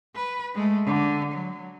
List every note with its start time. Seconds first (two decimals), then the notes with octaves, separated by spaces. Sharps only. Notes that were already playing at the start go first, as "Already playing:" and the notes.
0.14 B4
0.55 G#3 A3
0.86 D3
1.32 F#3